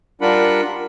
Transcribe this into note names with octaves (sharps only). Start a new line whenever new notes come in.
G3 D4 F4 A#4 F#5 B5